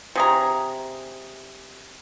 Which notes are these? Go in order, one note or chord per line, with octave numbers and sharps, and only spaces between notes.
C3 G#4 A#5